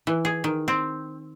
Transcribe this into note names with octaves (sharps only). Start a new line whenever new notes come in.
E3
G#4
D#3
C4